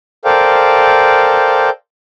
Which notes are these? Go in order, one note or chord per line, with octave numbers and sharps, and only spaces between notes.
A4 A#4 C5 D5 F5 G5